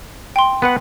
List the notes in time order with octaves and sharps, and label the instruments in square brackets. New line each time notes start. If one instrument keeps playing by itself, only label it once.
[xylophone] G5 C6
[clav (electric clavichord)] B3 B4 F#5